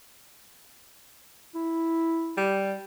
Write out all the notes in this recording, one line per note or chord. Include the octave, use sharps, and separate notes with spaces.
E4
G3